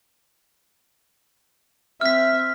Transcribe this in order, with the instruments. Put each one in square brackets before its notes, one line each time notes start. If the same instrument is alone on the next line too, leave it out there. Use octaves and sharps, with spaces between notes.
[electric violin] C4 E5 [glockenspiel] F6 B6